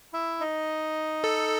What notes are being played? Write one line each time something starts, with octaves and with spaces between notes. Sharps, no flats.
E4 E5
D#4 D#5
A4